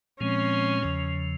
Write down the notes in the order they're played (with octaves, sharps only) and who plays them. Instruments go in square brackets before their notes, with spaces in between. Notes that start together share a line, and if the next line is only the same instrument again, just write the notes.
[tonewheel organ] A#2 F3 G#3 C4 [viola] C#4
[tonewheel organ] E2 C#3 F3